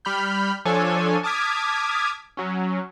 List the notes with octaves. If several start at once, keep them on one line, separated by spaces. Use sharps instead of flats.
G3 B5 F6 G6
F3 D4 A4 C#5 G#5
A5 D6 D#6 F6 G#6 B6
F#3 C#4